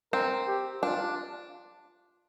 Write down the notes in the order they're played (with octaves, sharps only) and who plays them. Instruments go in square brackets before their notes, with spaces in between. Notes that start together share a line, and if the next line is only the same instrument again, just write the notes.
[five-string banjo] C4 [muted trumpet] A#4
[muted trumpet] G4
[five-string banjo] D4 [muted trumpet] F4